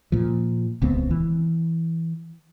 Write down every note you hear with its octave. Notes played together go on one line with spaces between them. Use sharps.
A#2 F3
D#1 C#2 B3 C4
E3